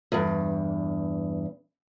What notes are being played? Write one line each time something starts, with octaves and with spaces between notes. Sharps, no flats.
E2 G2